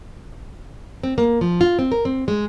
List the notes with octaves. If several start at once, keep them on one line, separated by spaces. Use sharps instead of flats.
C4
A#3
F3
F4
C4
A#4
C4
G#3